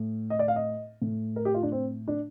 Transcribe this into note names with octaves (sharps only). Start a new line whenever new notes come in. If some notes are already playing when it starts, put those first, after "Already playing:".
Already playing: A2
D#5
D5
F5
D#5
A2
A#4
G4
F4
D4
C4
D4